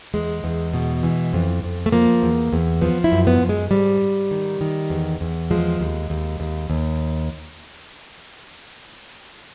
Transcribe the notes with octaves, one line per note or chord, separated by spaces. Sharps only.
E2 G#3
E2
B2
E3
F2
F2
A3
F3 A#3
E2
E2
F3 B3
E4
F#2
B3
F#2
G#3
G#2 G3
G#2
D#3
D#3
E2
E2
F3 G#3
D#2
D#2
D#2
D#2